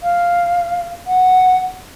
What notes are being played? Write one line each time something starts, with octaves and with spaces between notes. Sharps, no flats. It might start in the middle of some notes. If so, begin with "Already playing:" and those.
F5
F#5